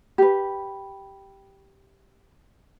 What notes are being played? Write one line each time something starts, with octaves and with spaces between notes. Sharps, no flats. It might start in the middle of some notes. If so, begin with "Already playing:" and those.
G4 B4